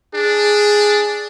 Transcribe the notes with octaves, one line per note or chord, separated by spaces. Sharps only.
D4 G#4